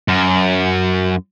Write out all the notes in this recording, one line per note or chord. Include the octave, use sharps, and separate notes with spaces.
F#2